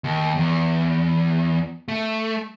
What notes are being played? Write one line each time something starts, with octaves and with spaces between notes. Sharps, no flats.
D#2
E2
A3